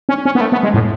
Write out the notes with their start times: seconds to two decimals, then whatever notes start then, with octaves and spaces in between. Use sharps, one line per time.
0.09 C#4
0.25 C#4
0.35 B3
0.41 A3
0.52 B3
0.63 G#3
0.74 A2